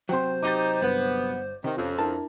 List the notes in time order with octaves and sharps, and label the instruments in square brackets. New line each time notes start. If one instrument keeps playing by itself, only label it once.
[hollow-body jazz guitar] C3 F#3 [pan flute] C5 [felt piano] G5 C6
[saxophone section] D#4 G4 [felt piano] D6 G6 A6
[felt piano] G1 [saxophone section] B3
[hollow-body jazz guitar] C3 [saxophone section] D#3
[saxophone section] F2 [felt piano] F3 C#4
[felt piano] D4 E4 A#4 [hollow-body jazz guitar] A5